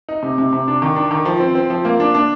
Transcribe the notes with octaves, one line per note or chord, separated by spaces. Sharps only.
D#4
C3
C3
C3
D4
D#3
D4
D#3
F3
C4
C4
F3
A#3
D4
D4